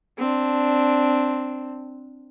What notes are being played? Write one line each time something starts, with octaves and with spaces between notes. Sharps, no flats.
C4 D4